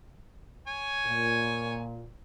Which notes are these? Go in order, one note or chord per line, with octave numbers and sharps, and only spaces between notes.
C#5 G#5
A#2